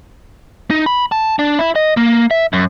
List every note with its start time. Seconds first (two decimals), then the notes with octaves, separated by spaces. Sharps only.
0.70 D#4
0.86 B5
1.12 A5
1.39 D4
1.59 E4
1.76 D#5
1.97 A#3
2.31 E5
2.53 F#2